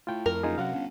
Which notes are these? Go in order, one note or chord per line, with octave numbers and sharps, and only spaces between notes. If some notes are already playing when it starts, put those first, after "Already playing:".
A2 F4 G5
F2 A#4
F#1 D#4 F4 G#4
F#2 C3 F#3 F5 F#5
G1 C#4